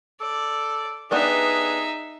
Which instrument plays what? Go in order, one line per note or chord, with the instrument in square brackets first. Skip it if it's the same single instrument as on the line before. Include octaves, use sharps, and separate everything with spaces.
[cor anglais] A4 [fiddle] D5
[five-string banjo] B3 D4 G4 [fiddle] D#4 E5 [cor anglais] G#4